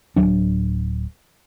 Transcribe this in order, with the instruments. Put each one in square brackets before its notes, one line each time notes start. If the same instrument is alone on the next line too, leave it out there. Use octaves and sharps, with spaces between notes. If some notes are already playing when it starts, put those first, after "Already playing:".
[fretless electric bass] D1 D#2 F#3 D4